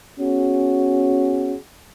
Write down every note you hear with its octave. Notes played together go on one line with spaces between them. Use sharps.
B3 C#4 F#4 G#4